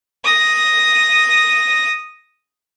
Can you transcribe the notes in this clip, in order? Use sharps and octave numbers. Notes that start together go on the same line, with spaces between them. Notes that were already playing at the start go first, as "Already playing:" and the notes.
D#6 A#6